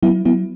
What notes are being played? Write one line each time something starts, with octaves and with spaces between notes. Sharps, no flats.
F#3 B3 E4
F#3 B3 E4